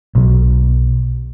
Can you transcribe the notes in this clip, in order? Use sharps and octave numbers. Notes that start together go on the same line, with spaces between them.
B1